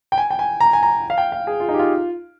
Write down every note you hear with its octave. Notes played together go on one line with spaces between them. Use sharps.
G5
G#5
G5
G#5
A#5
G#5
A#5
F5
G5
F5
G#4
F4
D#4
G4
F4